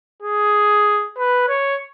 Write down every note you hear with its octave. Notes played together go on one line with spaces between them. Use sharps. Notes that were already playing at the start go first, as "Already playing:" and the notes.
G#4
B4
C#5